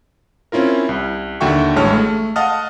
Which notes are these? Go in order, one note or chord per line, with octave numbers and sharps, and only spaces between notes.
C4 C#4 E4 F4 A#4
C2
D#2 D3 F#4 E5 G5 C#6
A1 A2 G#3 C#5 A5 F6
A3
D#5 F5 F#5 A5 D#6 F6